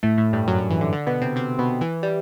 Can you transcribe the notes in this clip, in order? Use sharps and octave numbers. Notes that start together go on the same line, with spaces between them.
A2 A3
A2 A3
G2 G3
F#2 F#3
F#2 F#3
E3
D3
D3
B2 B3
C3 C4
C3 C4
B2 B3
E3
G3